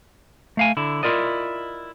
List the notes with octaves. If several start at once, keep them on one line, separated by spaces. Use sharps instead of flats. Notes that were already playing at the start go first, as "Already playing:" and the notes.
A3 F5 G#5
D3 E4
E4 F4 A#4 D5 D#5